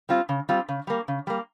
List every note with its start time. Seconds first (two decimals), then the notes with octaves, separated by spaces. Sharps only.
0.09 G3 C4 F4
0.29 C#3
0.49 G3 C4 F4
0.69 C#3
0.87 G3 A#3
1.08 C#3
1.27 G3 A#3